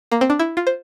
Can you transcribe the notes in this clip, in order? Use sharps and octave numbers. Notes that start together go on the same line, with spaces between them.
A#3
C4
D4
E4
F4
C5